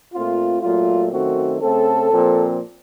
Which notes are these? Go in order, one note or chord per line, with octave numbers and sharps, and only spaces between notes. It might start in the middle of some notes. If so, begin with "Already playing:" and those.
A#2 A3 C4 F4
A#2 F#3 A3 F4
F#2 D#3 A3 C4 F#4
C#3 A3 C4 A4
A#2 F3 C4